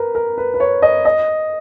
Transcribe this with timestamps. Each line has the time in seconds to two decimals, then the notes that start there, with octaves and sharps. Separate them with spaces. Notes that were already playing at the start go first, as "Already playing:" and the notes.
Already playing: A#4 B4
0.15 A#4
0.38 B4
0.54 B4
0.60 C#5
0.82 D#5
1.05 D#5